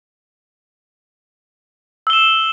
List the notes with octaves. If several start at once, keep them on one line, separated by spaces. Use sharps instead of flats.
E6 E7 G7